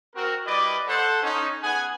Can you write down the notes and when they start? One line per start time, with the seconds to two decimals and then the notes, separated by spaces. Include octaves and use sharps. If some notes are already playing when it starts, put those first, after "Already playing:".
0.15 C4 F#4 A#4
0.46 G3 E4 B4 D5 D#5 D6
0.88 A4 C5 F#5
1.23 C#4 D#4
1.63 B3 G#4 F#5 G#5